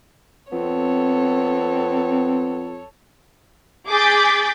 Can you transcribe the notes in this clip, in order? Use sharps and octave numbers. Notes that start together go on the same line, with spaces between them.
F2 B3 C4 A4 C#5
G#4 D6 G6 A6 B6